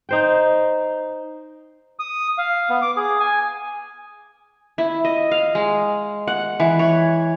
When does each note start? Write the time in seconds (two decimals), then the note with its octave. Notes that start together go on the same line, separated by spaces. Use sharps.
0.09 D#4 C5 G5
1.99 D#6
2.38 F5
2.70 B3
2.82 D6
2.97 G#4
3.20 G#5
4.78 E4
5.05 D#5
5.31 F5
5.55 G#3
6.27 F#5
6.60 E3
6.79 C#5